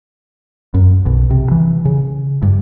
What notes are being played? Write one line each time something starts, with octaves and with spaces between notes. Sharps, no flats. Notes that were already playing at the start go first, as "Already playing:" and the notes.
F#2
B1
C3
E3
C#3
G2